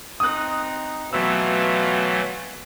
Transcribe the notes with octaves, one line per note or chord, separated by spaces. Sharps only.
C4 D#4 D#6 F#6
B2 E3 F#3 A3 F4 E6